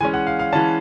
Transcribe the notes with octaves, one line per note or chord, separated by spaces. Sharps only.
E3 G#3 C#4 G#5
F#5
F5
F5
E3 G#3 C#4 A5